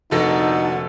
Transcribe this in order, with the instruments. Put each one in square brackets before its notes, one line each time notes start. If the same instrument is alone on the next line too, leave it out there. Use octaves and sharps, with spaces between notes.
[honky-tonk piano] F1 A4 A#6 [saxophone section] A#2 D3 F#4 [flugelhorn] D#4